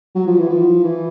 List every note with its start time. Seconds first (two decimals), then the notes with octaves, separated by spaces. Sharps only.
0.15 F#3
0.27 F3
0.38 E3
0.50 F3
0.84 E3